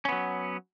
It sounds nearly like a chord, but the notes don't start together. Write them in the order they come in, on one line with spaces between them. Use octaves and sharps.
C#4 B3 F#3